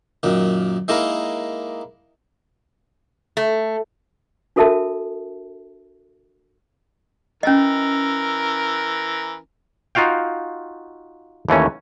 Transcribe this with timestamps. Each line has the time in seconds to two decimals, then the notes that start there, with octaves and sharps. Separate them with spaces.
0.23 F#2 A#2 D#3
0.88 G#3 A#3 D#4 E4 A#4
3.37 A3
4.56 D4 F#4 A4 A#4 E5 A5
7.43 E3 C#4 A#4 D#5
9.95 D#4 F4 F#4 F5 G5
11.49 D#2 E3 A3 C#4